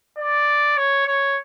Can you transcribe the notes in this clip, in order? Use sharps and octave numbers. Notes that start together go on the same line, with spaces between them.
D5
C#5
C#5